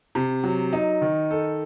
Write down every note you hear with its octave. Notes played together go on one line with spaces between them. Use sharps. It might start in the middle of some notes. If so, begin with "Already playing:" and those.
C3
F#3
D#4
D#3
A4